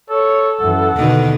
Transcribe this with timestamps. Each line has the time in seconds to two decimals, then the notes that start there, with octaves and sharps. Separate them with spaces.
0.10 A4 C#5
0.60 F#2 E3 F#5
0.97 E2 B2 D3 D#3